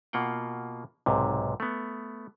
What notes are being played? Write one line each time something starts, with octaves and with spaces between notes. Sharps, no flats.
B2 A#3 F4 F#5 G5
B1 G#2 C3
A3 B3